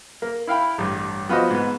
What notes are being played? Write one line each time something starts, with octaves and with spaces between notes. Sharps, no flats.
A#3
E4 F5 G5 B5
A1 G2
F3 B3 F4 F#4 C5 D#5
G#2 B3